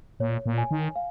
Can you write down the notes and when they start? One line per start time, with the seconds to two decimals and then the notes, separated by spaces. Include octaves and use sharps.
0.20 A#2 C#5
0.46 A#2
0.58 G#5
0.71 D#3
0.96 F5